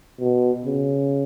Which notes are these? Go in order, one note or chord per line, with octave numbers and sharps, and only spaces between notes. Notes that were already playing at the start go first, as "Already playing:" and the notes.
B2
C#3